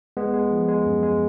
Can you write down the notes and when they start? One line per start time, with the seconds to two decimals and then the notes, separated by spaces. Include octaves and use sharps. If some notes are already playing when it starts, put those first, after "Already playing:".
0.17 G#3 B3
0.34 G#3
0.51 F3
0.68 G#3
0.86 F#2
1.03 G#3